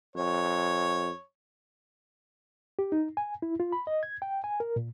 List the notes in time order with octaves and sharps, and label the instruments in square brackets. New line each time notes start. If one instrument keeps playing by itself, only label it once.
[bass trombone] F2 [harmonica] C#5
[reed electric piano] G4
D#4
G#5
E4
F4
B5
D#5
G#6
G5
G#5
A#4
A#2